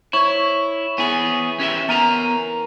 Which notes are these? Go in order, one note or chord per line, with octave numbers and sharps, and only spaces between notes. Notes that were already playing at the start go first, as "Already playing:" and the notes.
E4 C#5
E3 B3 G#4
C#4 G4 E5
B3 A#4 G#5 A#5